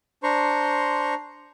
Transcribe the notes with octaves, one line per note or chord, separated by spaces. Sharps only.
D4 C5 A#5 C6 C#6